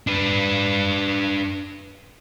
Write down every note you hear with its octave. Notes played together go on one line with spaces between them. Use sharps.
D4 B4